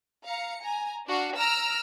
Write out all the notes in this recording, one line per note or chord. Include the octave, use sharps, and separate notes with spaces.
F5 A#5 C#7
G#5 A#5
D4 F#4 F5
A#5 E6 F6 A#6 D7